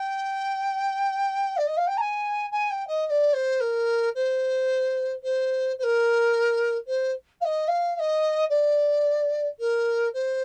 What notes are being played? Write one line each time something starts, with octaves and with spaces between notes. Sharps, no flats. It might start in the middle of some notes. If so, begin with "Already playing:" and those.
Already playing: G5
D5
D#5
F5
G5
A#5
G#5
G#5
G5
D#5
D#5
D5
C5
A#4
C5
C5
C5
A#4
C5
F5
D#5
F5
F5
D#5
D5
A#4
C5